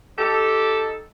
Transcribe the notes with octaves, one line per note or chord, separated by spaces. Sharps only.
D#4 G4 A4